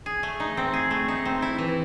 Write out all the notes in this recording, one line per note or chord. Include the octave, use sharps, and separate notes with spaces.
G#4
A3
D#4
C4
G#4
A3
D#4
C4
E4
E3